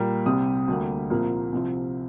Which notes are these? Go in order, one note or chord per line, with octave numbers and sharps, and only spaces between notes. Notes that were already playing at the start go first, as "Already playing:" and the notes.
Already playing: A#2 G3 A#3
C2 C3 G3 D#6
D2 D3 G3 A#3
C2 A#2 F3 A#3
C2 C3 F3